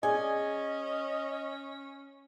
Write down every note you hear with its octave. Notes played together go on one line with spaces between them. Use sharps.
C#4 G#4 D5 D#5 G#5